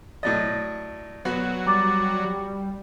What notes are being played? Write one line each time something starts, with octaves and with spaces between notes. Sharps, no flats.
A2 F#3 D5 D#5 A6
F#3 B3 F#4
G3 A#5 D6 A6